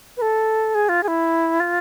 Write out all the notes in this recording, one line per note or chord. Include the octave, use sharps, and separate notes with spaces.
B4
A4
G#4
F4
G#4
E4
F4